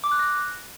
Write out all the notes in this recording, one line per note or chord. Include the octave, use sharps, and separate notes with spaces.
D6
F#6
A#6